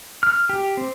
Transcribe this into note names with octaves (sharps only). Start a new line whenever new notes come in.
F6
G4
C4